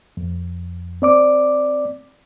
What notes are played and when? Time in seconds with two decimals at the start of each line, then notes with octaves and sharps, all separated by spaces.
0.17 F2
1.02 C4 D5 D6